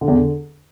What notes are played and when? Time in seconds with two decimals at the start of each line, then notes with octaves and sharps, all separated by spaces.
0.01 D3
0.08 E2
0.15 D3